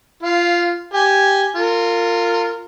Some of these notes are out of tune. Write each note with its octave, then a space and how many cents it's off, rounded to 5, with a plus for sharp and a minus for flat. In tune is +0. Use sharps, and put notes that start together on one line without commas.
F4 -15 F5 +0
G4 +0 G#5 +0
F4 +0 A#4 -35